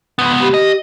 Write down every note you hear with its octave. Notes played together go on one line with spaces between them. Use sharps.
C#2 B3
G4
D#5